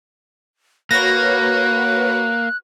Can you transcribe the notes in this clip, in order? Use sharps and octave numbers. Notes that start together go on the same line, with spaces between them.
A#3 F#4 B4 C#5 F#6 A#6